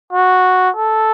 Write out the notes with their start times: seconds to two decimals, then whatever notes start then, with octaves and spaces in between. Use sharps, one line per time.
0.13 F#4
0.76 A4